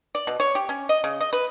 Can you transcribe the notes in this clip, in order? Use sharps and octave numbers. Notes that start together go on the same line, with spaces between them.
D5
B2
C#5
G4
C#4
D#5
C#3
D#5
B4